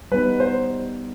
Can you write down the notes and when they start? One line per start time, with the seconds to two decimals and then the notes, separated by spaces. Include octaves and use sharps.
0.12 G3 B3 D#4 B4
0.40 C5